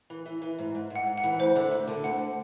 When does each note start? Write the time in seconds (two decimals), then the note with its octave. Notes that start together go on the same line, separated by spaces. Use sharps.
0.10 E3
0.26 E3
0.42 E3
0.59 G#2
0.75 G#2
0.90 G#2
0.95 F#5
1.07 G#2
1.18 F#5
1.23 E3
1.39 D2 C5
1.55 D3
1.71 D2
1.88 D3
2.04 D2 F#5